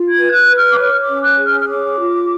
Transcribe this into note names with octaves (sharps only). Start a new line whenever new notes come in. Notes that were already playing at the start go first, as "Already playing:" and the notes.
Already playing: F4
G#6
B4
F#6
B4
F6
D6
C#5 F6
D6
C#4
F#6
G#4
F6
F6
C#5 D6
F4